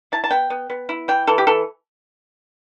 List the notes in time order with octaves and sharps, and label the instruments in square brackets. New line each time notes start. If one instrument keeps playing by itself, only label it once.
[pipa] E4 A5
A5
B3 G5
B3
B3
E4
E3 G5
E3 A4
G4
E3 A4